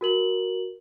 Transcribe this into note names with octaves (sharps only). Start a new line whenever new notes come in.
F#4 A#4 F#7